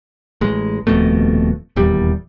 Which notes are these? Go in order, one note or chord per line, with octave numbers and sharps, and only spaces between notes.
A1 G#3
D#1 F2 B2 A3
D#1 E2 G3